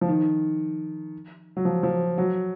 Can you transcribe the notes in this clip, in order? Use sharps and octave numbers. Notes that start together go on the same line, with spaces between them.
F3
D#3
F#3
F3
F3
F#3